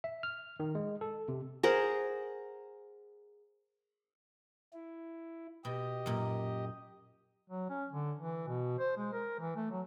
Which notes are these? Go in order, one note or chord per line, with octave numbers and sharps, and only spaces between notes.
E5
F6
D#3
G#3
A4
C3
G#4 A#4 C5 F#5
E4
B2 G4 D#5
F#2 A#2
F#3
C#4
D3
E3
B2
C5
G#3
A#4
E3
A3
F#3